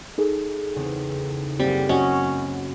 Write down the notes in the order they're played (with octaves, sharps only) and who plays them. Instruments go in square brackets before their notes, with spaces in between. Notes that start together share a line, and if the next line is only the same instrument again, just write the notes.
[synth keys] D#4 G#4 A4
[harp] E2 C#3 C4
[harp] F#2 A#3 [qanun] G3 [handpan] C4
[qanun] C#4 [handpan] F#4 D#5